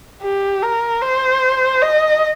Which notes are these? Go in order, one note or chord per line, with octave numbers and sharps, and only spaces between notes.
G4
A#4
C5
D#5